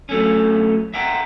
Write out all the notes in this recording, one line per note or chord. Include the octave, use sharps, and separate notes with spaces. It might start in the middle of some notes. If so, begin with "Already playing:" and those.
F#3 A3 C#4
E5 F#5 G5 A#5